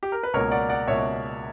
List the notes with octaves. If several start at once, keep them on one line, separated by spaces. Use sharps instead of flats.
G4
A#4
B4
C#2 B2 A#3 A#4 C#5
D5 F#5
D5 F#5
C#2 B2 A#3 C#5 E5